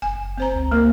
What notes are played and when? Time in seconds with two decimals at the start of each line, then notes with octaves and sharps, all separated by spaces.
0.02 F#1 G#5
0.38 C4 C5 A#5
0.55 C#2
0.71 A#3 A#4